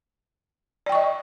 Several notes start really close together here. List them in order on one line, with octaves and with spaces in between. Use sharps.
D5 G5 C#6 D#5